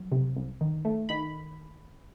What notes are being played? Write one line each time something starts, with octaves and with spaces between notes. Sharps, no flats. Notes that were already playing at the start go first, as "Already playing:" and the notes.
Already playing: F#3
C3
C2
D#3
A3
D#3 B5